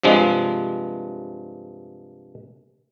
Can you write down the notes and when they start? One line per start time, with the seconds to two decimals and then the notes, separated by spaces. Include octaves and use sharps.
0.03 G2 C3 F3 G#3